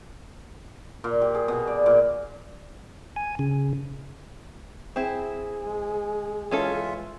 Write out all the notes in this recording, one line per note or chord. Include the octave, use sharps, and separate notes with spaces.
A#2
G4
G#4
B2
D5
A#2
G#5
C#3
C4 E4 G#4
G#3
E3 G#3 C#4 F4 A4 E5